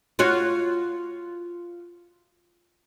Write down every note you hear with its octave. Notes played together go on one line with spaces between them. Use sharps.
F4 F#4 C#5